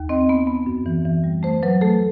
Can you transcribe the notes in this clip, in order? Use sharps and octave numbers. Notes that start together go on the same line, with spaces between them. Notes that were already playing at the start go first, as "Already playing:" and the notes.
Already playing: D#2
C4 D#5
B3
B3
F#2
E3
E3
G3
A3 C5
F#3 B4
A3 A4